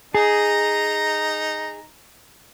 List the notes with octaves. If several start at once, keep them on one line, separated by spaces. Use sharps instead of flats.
D#4 G#4 A#5